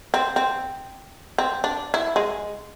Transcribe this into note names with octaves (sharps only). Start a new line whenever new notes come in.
C4
C4
C4
D4
E4
G#3